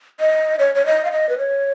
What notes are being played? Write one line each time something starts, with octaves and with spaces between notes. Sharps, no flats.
D#5
C#5
C#5
D#5
F5
D#5
B4
C#5